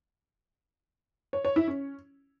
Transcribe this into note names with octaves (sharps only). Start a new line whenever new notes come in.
C#5
C#5
E4
C#4